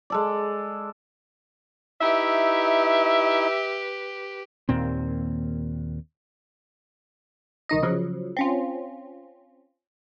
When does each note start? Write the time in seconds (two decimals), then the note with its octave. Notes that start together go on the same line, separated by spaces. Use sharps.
0.10 G#3 A4 D5
2.01 D#4 E4 G4 B4 E5
4.69 D#2 A#2 C4
7.69 C2 D#3 D#4 D#5
7.83 C#3 F3 F#3
8.37 C4 C#4 F4